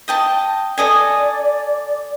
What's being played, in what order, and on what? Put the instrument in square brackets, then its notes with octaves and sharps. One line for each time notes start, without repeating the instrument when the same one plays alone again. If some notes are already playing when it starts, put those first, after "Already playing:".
[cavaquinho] D#5 G5 A5
[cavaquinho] A4 D#5 G#5 [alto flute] D5